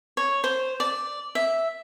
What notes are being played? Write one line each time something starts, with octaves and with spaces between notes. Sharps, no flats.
C#5
C5
D5
E5